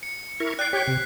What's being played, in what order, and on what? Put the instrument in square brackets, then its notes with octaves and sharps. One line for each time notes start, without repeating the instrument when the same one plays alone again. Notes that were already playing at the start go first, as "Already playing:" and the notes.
[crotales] C#7
[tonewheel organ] E4 A#4 C#6
[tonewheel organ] D5 G5 [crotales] F#6 C7
[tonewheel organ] G4 C#5 G5 [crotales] B6
[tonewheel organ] C3